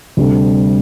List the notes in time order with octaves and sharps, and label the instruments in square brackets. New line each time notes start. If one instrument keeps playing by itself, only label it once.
[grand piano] D2 C3 G3 D4 A4